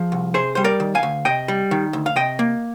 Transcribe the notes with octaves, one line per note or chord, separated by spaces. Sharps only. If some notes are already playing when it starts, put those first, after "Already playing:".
Already playing: F3 G#4
C2
C3 G#4 C5
G3 C5
A#4 D5
D#3
F5 G#5
D2
C3 D#5 G5
G3
D#3
D2
F5
C3 D#5 G5
A#3